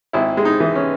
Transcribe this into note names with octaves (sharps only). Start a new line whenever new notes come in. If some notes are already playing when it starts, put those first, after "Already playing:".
G#1 E4
G#3
D#4
E3
C#4